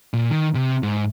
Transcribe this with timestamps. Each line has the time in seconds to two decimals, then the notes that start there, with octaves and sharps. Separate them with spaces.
0.13 A#2
0.30 D#3
0.55 C3
0.83 G#2